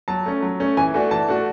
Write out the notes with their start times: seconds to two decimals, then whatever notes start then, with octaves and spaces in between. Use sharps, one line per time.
0.08 F#3 A5
0.26 A3 C#4
0.42 F#3
0.60 A3 C#4
0.77 E3 G#5
0.94 A3 D4 F#4 G#5
1.11 E3 A5
1.28 A3 D4 F#4